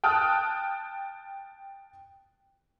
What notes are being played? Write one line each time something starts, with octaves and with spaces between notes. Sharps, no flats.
G5 A5 D#6 F6 F#6